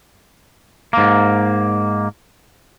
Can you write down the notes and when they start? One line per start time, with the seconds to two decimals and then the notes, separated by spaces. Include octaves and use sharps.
0.93 G#2 A#3